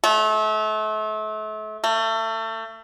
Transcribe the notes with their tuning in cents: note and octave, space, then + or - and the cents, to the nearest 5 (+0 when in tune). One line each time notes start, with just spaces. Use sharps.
A3 -35
A3 +30